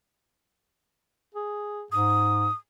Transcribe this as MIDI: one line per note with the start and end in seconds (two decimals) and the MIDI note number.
1.34 1.84 68
1.92 2.48 44
1.92 2.53 87